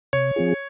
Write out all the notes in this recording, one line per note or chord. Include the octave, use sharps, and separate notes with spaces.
C3 C#5
F3 C4 F4 G#4